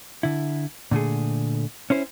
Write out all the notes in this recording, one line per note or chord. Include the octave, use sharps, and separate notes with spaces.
D3 E4
A#2 D3 A3 G#4
C#4 E4 C5